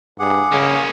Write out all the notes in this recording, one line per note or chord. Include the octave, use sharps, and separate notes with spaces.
G2 G#4 F#5 D6
C#3 A#3 C#4